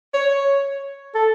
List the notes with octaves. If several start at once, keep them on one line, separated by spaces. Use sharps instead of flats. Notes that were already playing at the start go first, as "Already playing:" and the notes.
C#5
A4